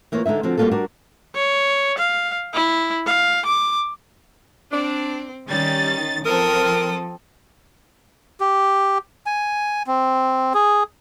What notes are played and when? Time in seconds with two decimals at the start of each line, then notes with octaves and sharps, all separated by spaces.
0.12 E3 A#3 F4 A#4 C#5
0.26 D3 G#3 D#4 E5
0.43 D3 F3 C4 F#4
0.57 G3 A#3 C4 F4 F#4 A4
0.71 G3 D4 F#4 A#4 D5
1.35 C#5
1.98 F5
2.54 E4
3.06 F5
3.46 D6
4.72 C4 D4
5.49 D#3 G3 C#4 D#4 A6
6.25 F3 C4 A4 A#4 D#6
8.40 G4
9.26 G#5
9.87 C4
10.54 G#4